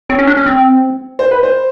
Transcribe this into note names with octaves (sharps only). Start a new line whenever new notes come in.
C4 C#5
C#4
D4
C#4
C4
C5
B4
C5